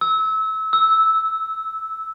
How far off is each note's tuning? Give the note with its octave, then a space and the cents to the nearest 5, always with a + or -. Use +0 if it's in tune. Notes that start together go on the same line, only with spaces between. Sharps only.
E6 -25
E6 -10